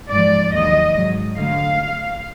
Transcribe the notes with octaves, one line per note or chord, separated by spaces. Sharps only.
G#2 F3 D5
D#2 D#3 F#3 D#5
G#2 F#3
D2 D3 F#3 F5